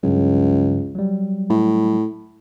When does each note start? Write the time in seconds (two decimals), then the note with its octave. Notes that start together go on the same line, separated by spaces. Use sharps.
0.03 C#2 G2 C#3 F#3
0.95 F#3 G3
1.50 A2